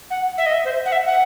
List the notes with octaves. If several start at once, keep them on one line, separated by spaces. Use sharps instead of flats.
F#5
E5
D#5
E5
C5
F#5
E5
F#5